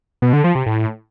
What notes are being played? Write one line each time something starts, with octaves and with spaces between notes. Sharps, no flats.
B2
D3
F3
C3
A2